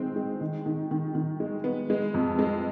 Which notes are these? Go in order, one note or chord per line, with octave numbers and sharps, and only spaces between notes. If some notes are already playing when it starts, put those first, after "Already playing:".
Already playing: D#3 G#3 C4
G#3
D#3
D#3
D#3
D#3
G#3
B3
G#3
F2
G#3